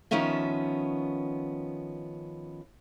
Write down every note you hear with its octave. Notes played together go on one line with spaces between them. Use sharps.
D#3 F3 B3 C#4 E5